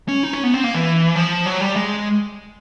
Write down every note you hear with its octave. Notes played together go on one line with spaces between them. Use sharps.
C#4
D#4
C#4
B3
C4
A#3
E3
F3
F#3
G3
G#3